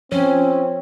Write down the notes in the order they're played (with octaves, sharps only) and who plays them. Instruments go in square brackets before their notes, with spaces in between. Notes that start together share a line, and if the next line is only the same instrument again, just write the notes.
[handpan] F3 C#5 [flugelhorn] C4 [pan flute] C#4